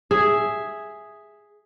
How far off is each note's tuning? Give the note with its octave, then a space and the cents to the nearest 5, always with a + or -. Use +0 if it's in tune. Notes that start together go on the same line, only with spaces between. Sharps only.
G#4 +0 E5 +0